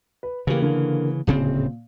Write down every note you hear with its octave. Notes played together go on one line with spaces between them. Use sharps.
B4
C#3 E3 A#3 G4 B4
D3 A#3
D1 A#2 C#3 C4